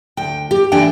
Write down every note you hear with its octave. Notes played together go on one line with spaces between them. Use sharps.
D2 G5
G4
A2 E3 A3 D4 G5 G#5